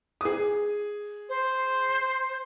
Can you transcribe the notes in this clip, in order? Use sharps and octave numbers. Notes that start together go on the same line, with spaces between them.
G#4 D#6
C5